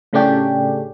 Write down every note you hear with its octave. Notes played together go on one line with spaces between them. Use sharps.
A2 C#3 A3 C#4 D4 G4